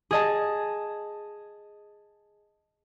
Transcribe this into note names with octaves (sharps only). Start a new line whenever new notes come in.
G#4 D#5 A5